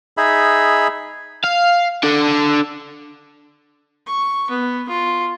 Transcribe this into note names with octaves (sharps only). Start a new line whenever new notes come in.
D#4 G#4 E5 B5
F5
D4 A4
C#6
B3
F4